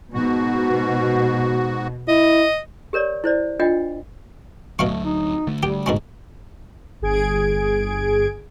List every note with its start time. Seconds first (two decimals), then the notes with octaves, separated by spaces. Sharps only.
0.14 G#2 B2 F#4
2.08 E4 D#5
2.93 G4 A#4 C#5 D5
3.24 E4 C5 D5
3.59 D4 F4 D#5 F#5 G5
4.79 D2 B2 F#3 A3 F5 C#6
5.05 D#4
5.47 D3 A3
5.63 G3 G4
5.86 G#2 B2 C#4
7.01 G1 G#4 G#6 D7